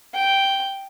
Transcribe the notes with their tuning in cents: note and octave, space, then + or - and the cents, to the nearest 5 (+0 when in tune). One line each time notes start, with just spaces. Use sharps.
G5 -5